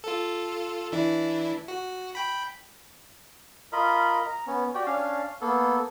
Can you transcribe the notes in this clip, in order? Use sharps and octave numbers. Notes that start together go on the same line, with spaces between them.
F4 A4
E3 D4 E4
F#4
G5 B5
F4 A#4 D#5 B5
A#5
B3 C#4
F#4 G4 D5 G5
C#4 D4 F5
A#3 B3 A4